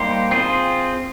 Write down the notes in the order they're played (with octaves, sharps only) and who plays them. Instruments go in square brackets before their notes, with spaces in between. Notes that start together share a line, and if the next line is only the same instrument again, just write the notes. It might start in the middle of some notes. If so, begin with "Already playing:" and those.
Already playing: [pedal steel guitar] G3 A#3 D#4 G4 C5
C4 F4 G#4 C5